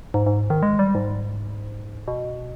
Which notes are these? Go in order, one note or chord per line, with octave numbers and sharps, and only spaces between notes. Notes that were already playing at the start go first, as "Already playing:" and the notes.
G#2
G#2
D#3
G#3
G3
G#2
B2